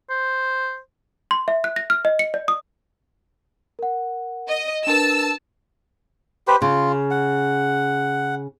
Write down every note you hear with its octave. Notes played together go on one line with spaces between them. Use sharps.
C5
C6
E5
F#6
A#6
F6
D#5
C#7
D5
D#6
A#4 F#5
D#5
D4 A#4 B4 A5 E6
G4 B4 C5
C#3 F4
F#5